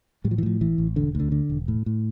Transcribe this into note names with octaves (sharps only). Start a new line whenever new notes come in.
A2 G3
F3
E3
A2 F3
A1 E3
A1
E1 D3
D2 D3
D3
E1
A2
A2